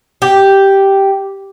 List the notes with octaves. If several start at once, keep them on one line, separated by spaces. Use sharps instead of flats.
G4